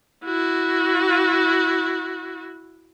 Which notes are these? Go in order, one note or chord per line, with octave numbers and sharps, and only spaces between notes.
E4 F#4